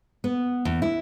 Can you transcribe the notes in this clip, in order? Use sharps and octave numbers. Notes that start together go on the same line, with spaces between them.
B3
E2
E4